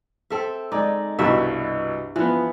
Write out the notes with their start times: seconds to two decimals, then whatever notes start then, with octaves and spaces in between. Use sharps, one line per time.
0.30 C4 A4 E5
0.72 G#3 D#4 D5
1.19 C2 G2 B2 E5
2.16 E3 F3 B3